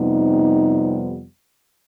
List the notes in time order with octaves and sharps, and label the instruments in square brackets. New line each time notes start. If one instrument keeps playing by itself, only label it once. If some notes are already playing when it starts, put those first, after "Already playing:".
Already playing: [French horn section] F2 C3 G3 B3 D#4